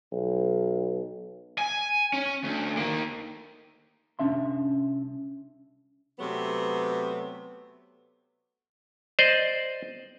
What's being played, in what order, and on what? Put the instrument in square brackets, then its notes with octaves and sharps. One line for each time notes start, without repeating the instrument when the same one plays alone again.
[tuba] B1
[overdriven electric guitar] G#5
C#4
D2
D#3 A#3
[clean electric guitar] C2 C#4 D4 E5 C6
[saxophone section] C3 F#3 A3 B3
[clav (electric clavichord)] C5 D5 D#5